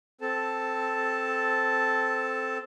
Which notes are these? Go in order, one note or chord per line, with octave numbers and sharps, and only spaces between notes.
C4 A4 A5